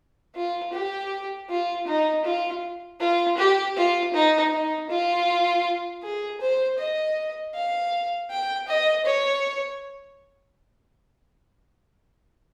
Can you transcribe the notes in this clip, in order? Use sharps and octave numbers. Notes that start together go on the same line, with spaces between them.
F4
G4
F4
D#4
F4
F4
G4
F4
D#4
D#4
F4
G#4
C5
D#5
F5
G5
D#5
C#5